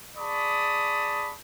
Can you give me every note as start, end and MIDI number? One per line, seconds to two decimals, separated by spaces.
0.17 1.33 68
0.17 1.33 74
0.17 1.33 81
0.17 1.33 83
0.17 1.33 85
0.17 1.33 87